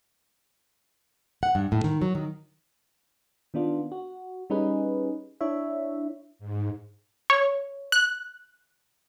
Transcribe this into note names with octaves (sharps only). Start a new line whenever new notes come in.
F#5
G2
A2
D#3
F#3
D#3
D#3 B3 D4 F4
F#4
G3 C#4 D#4 G#4 B4
D4 E4 C#5 E5
G#2
C#5
F#6